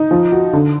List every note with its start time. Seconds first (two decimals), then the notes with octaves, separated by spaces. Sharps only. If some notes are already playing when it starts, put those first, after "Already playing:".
Already playing: D#4
0.11 F3
0.32 F#4
0.53 D3